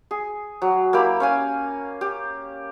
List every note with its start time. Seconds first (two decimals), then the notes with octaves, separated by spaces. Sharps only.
0.11 G#4
0.62 F#3
0.93 A#3 E4 G4 B5
1.20 C#4 F5 G#5
2.01 G4